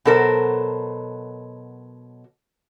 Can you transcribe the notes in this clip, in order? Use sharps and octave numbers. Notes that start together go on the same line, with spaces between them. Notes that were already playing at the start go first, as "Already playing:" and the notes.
B2 F#3 A4 A#4 C5